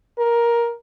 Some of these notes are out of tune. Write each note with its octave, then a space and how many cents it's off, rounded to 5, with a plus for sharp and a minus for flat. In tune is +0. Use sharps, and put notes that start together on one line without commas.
A#4 +10